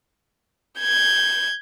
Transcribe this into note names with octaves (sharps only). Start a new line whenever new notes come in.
G6 G#6